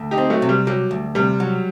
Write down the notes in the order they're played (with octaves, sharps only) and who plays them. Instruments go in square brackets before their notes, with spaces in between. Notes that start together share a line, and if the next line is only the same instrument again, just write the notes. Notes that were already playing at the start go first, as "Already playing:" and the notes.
Already playing: [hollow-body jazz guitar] D2
[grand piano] D#4 G4
[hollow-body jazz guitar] C4
[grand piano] F#3 A3
[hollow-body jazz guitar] C3
[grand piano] G3
[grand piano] F#3 [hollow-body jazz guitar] G3
[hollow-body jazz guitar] D2
[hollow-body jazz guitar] C3 [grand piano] G3
[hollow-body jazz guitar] F#3